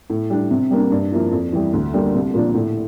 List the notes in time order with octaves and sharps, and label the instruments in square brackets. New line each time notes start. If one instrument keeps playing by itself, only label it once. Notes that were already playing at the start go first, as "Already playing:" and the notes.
[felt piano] A2
G3 D4
C3
G3 A#3 D4
G2
F3 A#3 E4
F2
E3 G3
D2
D3 G3 A#3
C2
A#2 F3 A#3 D4
A2